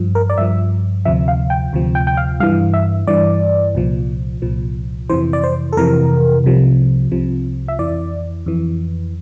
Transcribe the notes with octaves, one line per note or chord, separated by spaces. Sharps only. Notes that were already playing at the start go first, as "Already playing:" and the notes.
Already playing: G2 F3
A#4
D5
G2 F3 E5
D2 C3 F3 E5
F5
G5
D2 C3 F3
G5
G5
F5
G2 E3 F5
E5
G2 E3 D5
C2 A#2 F3
C2 A#2 F3
F2 C3 E3 C5
D5
C5
A4
F2 C3 E3 A#4
C2 C3 F3
C2 C3 F3
E5
F2 E3 D5
F2 E3